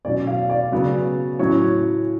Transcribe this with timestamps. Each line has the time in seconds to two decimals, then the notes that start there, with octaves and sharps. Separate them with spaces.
0.05 B2 F#3 C#4 D5
0.27 F5
0.49 D5
0.72 C#3 F#3 B3
1.39 A2 F#3 C#4 C#5